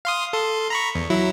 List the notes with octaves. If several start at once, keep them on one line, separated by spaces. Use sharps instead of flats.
F5 C6 D#6
A4 C6
A#5 B5 C#6
E2
F#3 E4